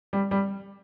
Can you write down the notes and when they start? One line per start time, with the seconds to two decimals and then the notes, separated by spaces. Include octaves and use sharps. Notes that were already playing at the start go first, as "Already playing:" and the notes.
0.13 G3
0.31 G3